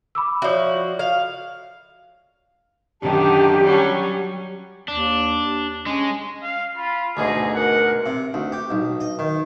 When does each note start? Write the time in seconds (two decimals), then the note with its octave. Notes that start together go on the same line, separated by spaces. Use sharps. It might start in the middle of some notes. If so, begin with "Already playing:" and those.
0.15 B5 D6 E6
0.42 F3 F#4 C#5 D5 E5
0.99 F5
3.02 F#2 D3 D#3 G4 A5
3.63 F#3 G3 C#4
4.88 D#2 D4
5.86 G#3 C#4
6.43 F5
6.77 F4 B5
7.17 D2 G#2 B2 G#4 D#5
7.55 A#4 F#5
8.06 C3
8.34 D2
8.52 G4
8.71 B1
9.00 D#5
9.19 D#3